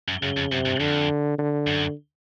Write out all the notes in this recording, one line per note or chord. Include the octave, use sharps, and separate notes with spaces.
F#2
F#2 C#3
F2
F#2 C3
G2
F2 D3
D3
F#2